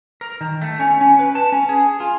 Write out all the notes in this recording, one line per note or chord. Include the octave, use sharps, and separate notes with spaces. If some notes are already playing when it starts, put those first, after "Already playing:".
A#4
D#3
A3
C#4
C#4
B4
A5
C#4
G#4
F4